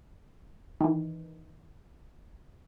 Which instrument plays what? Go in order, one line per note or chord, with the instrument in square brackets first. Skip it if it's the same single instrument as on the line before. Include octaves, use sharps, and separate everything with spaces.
[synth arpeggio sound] D#3 E3